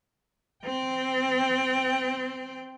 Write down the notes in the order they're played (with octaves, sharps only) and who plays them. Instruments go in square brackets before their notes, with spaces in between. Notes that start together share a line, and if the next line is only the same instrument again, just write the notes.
[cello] C4 G5